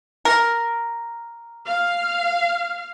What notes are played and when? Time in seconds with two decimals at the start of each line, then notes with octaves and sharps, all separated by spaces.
0.25 A#4
1.66 F5